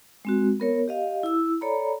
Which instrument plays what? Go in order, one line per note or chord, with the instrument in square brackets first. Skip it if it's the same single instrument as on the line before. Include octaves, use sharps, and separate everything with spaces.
[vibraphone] G#3 C4 F#4
B3 A#4 C#5
G4 D#5 F5
E4 E6
A4 C#5 D5 A#5 B5